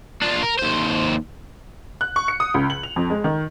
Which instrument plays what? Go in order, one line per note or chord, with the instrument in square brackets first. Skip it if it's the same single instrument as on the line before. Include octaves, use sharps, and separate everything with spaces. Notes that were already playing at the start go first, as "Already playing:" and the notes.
[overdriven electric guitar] D4 F4
A#4
D#2 C5
[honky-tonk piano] F#6
C#6
C#7
D#6
C#2
F#7
F7
F2
G#3
D#3